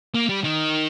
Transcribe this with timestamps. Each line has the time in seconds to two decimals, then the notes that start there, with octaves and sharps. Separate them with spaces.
0.14 A#3
0.29 G3
0.44 D#3